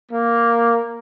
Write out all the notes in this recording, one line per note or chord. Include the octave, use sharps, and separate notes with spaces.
A#3